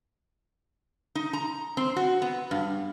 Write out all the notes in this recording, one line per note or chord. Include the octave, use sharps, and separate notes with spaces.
D#4
A#5
C4
F#4
B3
G2